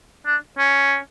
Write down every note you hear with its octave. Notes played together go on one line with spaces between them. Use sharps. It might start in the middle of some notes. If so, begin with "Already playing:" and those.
D4
C#4